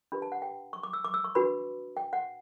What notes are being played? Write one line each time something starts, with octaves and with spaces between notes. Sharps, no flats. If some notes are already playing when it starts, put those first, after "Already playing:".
D4 G4 B4 B5
A5
F#5
G5
C#6
D6
E6
D6
E6
C#6
D4 F#4 B4 B5
G5
F#5